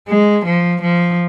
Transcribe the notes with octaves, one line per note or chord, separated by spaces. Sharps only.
G#3
F3
F3